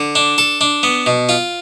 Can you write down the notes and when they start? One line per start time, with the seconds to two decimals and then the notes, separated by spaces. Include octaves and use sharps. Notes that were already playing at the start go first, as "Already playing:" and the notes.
Already playing: D3
0.15 D4
0.38 A4
0.61 D4
0.83 B3
1.06 B2
1.29 F4